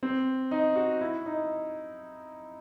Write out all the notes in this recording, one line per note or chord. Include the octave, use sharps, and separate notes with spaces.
C4
D#4
F#4
E4
D#4